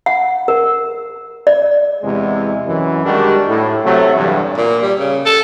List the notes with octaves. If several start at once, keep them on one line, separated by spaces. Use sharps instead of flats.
F#5
A#4
D5
E2 C3 G#3
F#2 E3
D#3 G3 G#3 D4 F#4 G4
A2
C3 F#3 A3
E2 G2
A#2
G3
C#3
A4